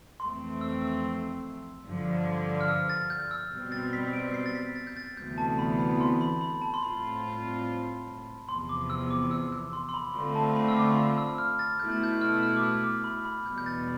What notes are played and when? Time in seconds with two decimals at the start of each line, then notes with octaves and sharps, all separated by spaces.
0.20 F2 E3 A3 C4 C6
0.61 E6
0.82 E6
1.86 G2 D3 F3
2.61 F6
2.68 E6
2.90 A6
3.10 G6
3.31 E6
3.51 B2 G3 C4
3.72 A6
3.93 B6
4.13 D7
4.34 C7
4.46 A6
4.55 B6
4.76 A6
4.87 G6
4.97 A6
5.17 D2 C3 E3 B3 G6
5.38 A5
5.50 A5
5.59 B5
5.79 B5
6.01 C6
6.21 B5
6.41 B5
6.62 A5
6.74 C6
6.83 A2 G3 C4 F4 B5
8.49 E2 C3 F3 C6
8.69 D6
8.90 E6
9.11 D6
9.31 E6
9.52 E6
9.73 C6
9.89 C6
9.94 B5
10.14 D3 A3 C4 F4 C6
10.35 A5
10.56 B5
10.68 E6
10.77 D6
10.97 E6
11.18 E6
11.38 F6
11.59 A6
11.79 B2 A3 E4 G6
11.92 A6
12.03 G6
12.21 F6
12.33 E6
12.43 F6
12.57 D6
12.63 E6
12.84 D6
13.04 B5
13.25 B5
13.45 E2 B2 G3 G6
13.58 G6
13.66 A6